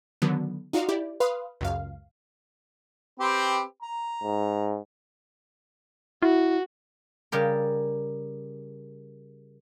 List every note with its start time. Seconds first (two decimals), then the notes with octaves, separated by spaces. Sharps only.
0.22 D3 D#3 F#3 B3
0.73 D#4 F4 F#4 D5 F5
0.89 E4 G4 D5
1.20 B4 F5 C6 D#6
1.61 C#2 F#2 F5
3.20 C4 G4 B4
3.82 A#5
4.23 G#2
6.22 E4 F#4
7.32 C#3 G3 G4 A#4